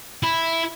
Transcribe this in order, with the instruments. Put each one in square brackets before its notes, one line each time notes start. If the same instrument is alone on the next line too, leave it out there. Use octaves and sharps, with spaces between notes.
[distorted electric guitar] E4